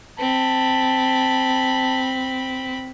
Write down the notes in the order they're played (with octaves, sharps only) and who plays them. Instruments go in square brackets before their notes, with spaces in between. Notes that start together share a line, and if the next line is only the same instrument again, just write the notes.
[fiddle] C4 B5 [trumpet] A5